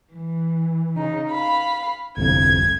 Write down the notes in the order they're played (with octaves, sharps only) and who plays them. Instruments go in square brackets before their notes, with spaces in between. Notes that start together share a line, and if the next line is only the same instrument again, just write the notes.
[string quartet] E3
C#3 D#4
F5 B5
[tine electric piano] G1 C2 F2 [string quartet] G#6